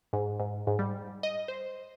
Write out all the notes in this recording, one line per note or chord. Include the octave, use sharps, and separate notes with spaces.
G#2
G#2
G#2
G3
D#5
C5